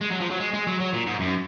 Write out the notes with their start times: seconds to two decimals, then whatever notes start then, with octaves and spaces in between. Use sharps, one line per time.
0.01 G#3
0.10 F#3
0.20 F3
0.30 F#3
0.40 G#3
0.54 G#3
0.67 F#3
0.80 F#3
0.93 A#2
1.07 G#2
1.20 F#2